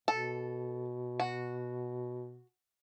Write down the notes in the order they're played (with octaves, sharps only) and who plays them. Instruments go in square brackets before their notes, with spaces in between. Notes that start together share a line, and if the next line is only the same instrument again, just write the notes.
[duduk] B2 [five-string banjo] A4
[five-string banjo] F#4